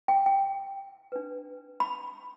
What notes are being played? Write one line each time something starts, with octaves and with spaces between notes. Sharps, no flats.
G5
G5
D4 B4
B5